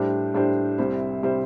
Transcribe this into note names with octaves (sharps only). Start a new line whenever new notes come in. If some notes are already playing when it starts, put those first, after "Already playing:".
Already playing: A2 G3 D4 G4 C5
A2 G3 D4 G4 C5
C2 C3 G3 E4 C5
C3 G3 E4 C5